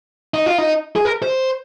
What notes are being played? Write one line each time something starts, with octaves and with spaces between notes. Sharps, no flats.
D#4
F4
D#4
G#4
A#4
C5